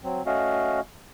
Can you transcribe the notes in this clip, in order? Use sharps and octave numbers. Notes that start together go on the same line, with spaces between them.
F#3 C4
A3 C#4 F#4 D#5 F5